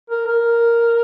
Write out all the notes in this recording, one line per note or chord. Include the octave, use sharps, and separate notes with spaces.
A#4
A#4